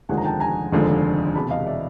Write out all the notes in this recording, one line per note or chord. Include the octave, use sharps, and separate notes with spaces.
F1 D#2 D3 F3 G#3 F#5 G#5
A#5
G5 A5
G#5 A#5
F1 D#2 D3 F3 G#3
E1 E2 C3 A5 B5
D#5 F5
D5 E5